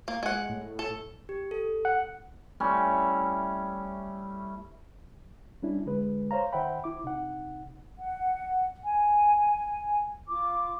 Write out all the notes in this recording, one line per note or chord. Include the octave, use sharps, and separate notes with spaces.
A#3
G#3 F#5
A2
A4
G4
A4
F#5
G3 A3 C#4 E4
G3 C#4 D4 E4
D3 G#3 B4
C5 C#5 F5 A#5
D#3 C5 E5 F#5 G5 B5
E4 D6
C3 D#4 F#5
F#5
G#5
F4 D6